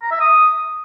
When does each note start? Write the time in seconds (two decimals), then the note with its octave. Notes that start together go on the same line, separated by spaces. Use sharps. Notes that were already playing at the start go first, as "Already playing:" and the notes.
0.02 A#5
0.11 E5
0.20 D#6